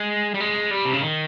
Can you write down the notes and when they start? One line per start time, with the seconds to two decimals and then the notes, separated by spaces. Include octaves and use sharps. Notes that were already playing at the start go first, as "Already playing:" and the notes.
Already playing: G#3
0.34 G3
0.40 G#3
0.71 G3
0.85 C3
0.93 C#3
1.01 D#3